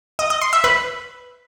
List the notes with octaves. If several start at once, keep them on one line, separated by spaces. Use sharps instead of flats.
D#5
D#5
C6
E5
B4